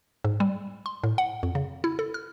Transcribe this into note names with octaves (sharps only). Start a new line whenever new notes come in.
G#2
G3
C6
A2
F#5
F2
C#3
E4
A4
F6